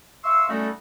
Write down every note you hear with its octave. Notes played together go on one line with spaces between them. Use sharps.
E5 F5 C6 C#6 E6
G3 A3 C#4 D#4 F#4 A4